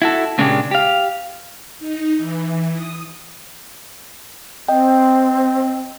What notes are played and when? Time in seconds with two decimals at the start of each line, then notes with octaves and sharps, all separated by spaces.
0.02 E4 F#4 A4
0.38 A#2 C#3 G#3 A#3 D4 G4
0.71 G4 F5
1.79 D#4
2.17 E3
2.73 D#6
4.68 C4 D#5 G5